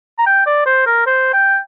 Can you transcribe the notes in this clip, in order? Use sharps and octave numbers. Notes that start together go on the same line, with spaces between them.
A#5
G5
D5
C5
A#4
C5
G5